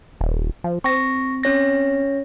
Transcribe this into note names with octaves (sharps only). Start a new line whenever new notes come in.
D#1
F3
C4 C#6 A#6
C#4 C#5 A#6